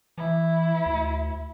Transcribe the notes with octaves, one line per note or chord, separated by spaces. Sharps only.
E3 E4
D2